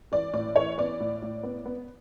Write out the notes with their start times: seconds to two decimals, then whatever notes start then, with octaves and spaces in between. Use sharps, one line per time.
0.12 E3 D5
0.34 A2 D5
0.56 E3 C#5
0.78 B3 D5
1.00 A2
1.22 A2
1.43 B3
1.66 B3